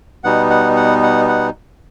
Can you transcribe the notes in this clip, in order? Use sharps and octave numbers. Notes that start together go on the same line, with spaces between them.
B2 G3 B3 D#4 F#5
F#5
F#5
F#5
F#5